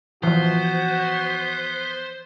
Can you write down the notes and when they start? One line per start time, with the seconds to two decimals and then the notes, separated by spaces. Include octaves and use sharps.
0.23 E3 F3 B3 F#4 C5